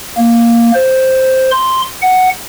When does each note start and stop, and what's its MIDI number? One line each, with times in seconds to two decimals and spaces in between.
0.17 0.72 58
0.74 1.51 72
1.51 1.82 84
2.02 2.29 78